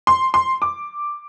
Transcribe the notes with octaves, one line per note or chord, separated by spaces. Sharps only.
C6
C6
D6